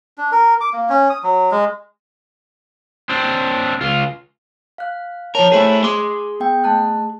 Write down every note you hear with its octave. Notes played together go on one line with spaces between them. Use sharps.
D4
A#4
D6
A#3
C#4
D#6
F#3
G#3
C4 D4
C#2 F4
F5 F#6
F3 A#4 C#5 A5 A#5
A3 E4 G#4 C5
G#4 C6 D6
B3 G5 G6
A3 A5 F#6